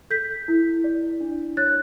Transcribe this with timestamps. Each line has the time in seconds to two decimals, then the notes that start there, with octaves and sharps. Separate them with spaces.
0.10 A4 G6 B6
0.48 E4
0.84 D5
1.21 D4
1.57 C#5 F#6 A6